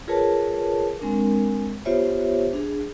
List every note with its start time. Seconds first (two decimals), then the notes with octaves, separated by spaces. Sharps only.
0.08 F4 G#4 A#4 B4 C#5 A5
1.00 G#3 C4 D4 A#4
1.85 B3 F4 G4 C5 C#5 E5
2.53 D4 G#4